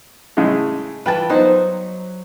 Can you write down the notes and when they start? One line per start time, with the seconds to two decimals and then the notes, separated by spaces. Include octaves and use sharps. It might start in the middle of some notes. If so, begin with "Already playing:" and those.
0.37 A2 C#3 G#3
1.06 E3 F4 B4 G5 A5
1.29 F#3 B3 D#4 C5